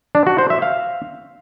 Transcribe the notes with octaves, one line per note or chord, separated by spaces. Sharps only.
D4
F#4
C5
E5
F5